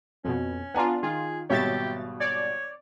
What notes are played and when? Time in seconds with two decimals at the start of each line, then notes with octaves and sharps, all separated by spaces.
0.24 F2 B2 C#4
0.75 B3 D4 F4 F#5 G#5 A#5
1.03 D#3 F4 G#4
1.50 G#1 B2 G3 G4 C#5 E5 A6
2.20 C#5 D5